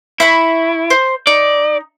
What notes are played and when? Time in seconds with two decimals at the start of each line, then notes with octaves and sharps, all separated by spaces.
0.20 E4 E5 B5 C#6
0.90 C5
1.27 D#4 D5